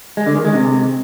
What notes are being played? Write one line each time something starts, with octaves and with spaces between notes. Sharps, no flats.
G#3
D3
D#3
G#3
C3